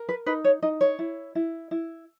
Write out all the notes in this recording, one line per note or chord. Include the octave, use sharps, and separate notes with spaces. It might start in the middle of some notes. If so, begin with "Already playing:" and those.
Already playing: A#4
B4
D#4 B4
C#5
D#4 D#5
C#5
E4
E4
E4